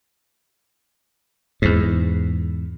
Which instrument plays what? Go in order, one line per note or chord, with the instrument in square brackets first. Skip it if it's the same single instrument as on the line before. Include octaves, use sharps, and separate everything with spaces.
[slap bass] E2 G#2